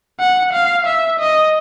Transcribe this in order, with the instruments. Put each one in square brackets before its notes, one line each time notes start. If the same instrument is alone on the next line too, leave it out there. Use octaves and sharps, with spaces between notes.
[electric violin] F#5
F5
E5
D#5